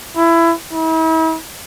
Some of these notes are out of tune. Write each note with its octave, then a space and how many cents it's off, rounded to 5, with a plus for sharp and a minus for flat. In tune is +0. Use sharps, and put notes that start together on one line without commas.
E4 +20
E4 -40